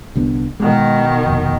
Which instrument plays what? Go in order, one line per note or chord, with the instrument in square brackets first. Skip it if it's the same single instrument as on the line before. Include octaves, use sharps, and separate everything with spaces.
[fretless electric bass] C2 D3 B3
[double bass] B2 D#3 [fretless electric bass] G#3
[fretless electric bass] F1 D#2